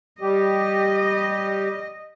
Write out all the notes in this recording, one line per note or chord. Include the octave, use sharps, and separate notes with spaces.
G3 G4 D#5